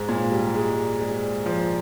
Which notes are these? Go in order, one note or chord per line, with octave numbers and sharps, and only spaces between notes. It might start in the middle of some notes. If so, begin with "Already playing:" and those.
Already playing: G#2
A#2
G3
G#3
G#3
F3